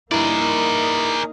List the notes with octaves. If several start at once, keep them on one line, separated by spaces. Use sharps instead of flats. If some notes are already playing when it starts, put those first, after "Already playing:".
G2 A#3 D#4 E4 G#4 A#4 D5